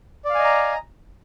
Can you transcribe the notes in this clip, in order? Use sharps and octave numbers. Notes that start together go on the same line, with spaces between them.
D5 D#5 F5 G#5 A#5